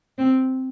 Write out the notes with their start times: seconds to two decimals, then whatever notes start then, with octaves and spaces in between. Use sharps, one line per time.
0.18 C4